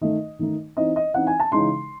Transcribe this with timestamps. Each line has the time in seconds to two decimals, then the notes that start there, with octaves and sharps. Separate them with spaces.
0.01 D#3 A3 D#4 D#5
0.39 D#3 A3 D#4
0.77 E3 C4 D#4 D#5
0.96 D#5
1.14 E3 C4 D#4 F#5
1.27 G#5
1.40 A5
1.52 C#3 E3 G#3 D#4 C6